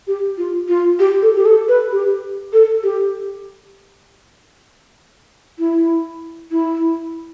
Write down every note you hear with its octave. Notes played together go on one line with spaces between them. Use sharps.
G4
F4
F4
G4
A4
G4
A4
B4
G4
A4
G4
E4
E4